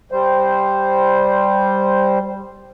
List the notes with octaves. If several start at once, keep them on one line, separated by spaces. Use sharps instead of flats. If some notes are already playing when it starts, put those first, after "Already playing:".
G3 C5